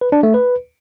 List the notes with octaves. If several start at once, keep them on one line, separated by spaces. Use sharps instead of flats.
B4
D4
A3
B4